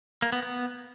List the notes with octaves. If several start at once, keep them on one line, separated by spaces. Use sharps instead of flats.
A#3
B3
B3